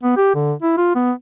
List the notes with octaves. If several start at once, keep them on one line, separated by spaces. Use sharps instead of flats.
B3
G4
D3
E4
F4
B3